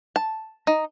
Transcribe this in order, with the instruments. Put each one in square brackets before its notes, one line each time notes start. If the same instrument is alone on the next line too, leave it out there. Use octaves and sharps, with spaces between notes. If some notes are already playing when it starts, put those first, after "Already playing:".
[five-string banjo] A5
D#4